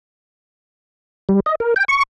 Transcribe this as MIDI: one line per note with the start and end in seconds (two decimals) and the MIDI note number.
1.29 1.40 55
1.46 1.55 75
1.60 1.74 70
1.76 1.85 79
1.88 2.03 85